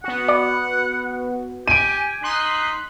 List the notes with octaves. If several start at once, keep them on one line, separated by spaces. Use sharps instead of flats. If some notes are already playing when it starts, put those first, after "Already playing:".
B3 F#4 F#5
D5
G4 G#5 D7 D#7
D#4 C6 F#6 B6